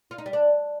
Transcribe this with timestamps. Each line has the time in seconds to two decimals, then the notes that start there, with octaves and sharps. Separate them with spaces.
0.11 F4
0.18 D#4
0.26 G3
0.33 D4